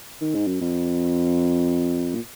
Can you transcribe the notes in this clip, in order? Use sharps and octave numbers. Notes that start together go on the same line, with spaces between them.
D#3
G#2
F#2
F2
A#2